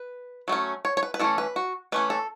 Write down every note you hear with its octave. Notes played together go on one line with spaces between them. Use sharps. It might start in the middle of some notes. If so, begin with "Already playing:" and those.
Already playing: B4
F#3 A3 C#4
C#5
C#5
B4
B4
E3 A3 C#4 A4
B4
F#4
E3 A3 C#4 B4
A4